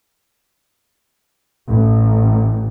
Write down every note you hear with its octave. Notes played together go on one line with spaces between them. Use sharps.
A1